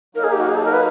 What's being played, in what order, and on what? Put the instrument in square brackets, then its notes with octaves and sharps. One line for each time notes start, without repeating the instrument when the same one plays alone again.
[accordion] F#3 A#3 D#4 [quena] A#4
[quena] G#4
G4
F#4
G#4
A4
A#4
B4